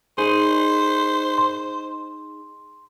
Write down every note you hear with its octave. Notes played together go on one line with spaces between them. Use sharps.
D#4 G#4 C5
C6